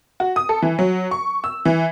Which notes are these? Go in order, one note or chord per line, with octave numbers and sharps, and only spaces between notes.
F#4
D#6
A4
E3
F#3
C#6
E6
E3